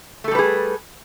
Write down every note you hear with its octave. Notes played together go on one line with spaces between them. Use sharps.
G3 A3 G#4 A4 B4